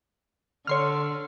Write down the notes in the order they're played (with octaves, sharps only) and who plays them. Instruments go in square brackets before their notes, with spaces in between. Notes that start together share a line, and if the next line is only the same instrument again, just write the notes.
[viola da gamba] D3 [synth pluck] C#5 C6 F6